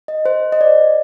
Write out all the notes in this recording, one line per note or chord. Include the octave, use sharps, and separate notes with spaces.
D#5
C5
D#5
D5